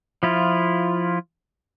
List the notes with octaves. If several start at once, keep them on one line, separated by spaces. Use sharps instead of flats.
F3 E4 F4